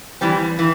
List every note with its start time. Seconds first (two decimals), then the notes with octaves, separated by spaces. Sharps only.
0.21 E3 G3 C4
0.59 E3